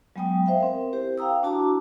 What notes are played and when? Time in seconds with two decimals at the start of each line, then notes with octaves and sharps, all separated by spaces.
0.16 F#3 G#3 B3 G5 G#5 D#6
0.46 C5 E5 F5 G5
0.60 C4 A#4
0.93 E4 G4 C5
1.18 F5 G5 A#5 D#6 E6
1.43 D4 E4 F#4 A5 A#5 D6